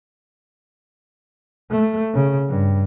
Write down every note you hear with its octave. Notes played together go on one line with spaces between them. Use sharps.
A3
C#3
G2